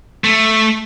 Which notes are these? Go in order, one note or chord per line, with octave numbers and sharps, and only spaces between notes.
A3